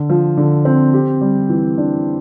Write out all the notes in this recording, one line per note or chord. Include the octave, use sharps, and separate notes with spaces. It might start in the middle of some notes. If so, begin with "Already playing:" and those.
Already playing: D3
F3
D3
C4
G4
G3
E3
D4